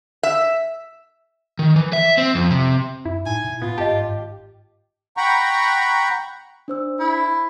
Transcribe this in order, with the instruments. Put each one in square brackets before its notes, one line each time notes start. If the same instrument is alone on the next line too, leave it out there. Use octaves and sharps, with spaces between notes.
[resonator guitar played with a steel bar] E5
[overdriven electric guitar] D#3
E3
E5
C4
F2
C3
[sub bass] F#2 [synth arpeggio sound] E4
[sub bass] A2 [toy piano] D#4 [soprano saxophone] G#5
[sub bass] B2
[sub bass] A2 [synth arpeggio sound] B3 [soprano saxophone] F4
[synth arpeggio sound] G#1 G4 [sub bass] G2 [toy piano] D#5 A5
[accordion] F#5 G5 A#5 B5 C#6
[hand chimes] D4 C5 E6
[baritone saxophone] E4